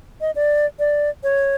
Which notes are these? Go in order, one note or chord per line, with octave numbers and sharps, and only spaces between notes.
D#5
D5
D5
C#5